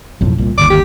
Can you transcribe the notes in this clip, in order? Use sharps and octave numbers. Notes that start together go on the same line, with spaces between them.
B1 F2 A2
C2 A#2
G1 D#2 D6
G4